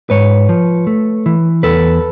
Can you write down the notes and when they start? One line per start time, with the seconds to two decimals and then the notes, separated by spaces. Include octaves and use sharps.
0.10 G#2 B4 C#5
0.49 F3
0.87 A3
1.26 E3
1.63 E2 A4 B4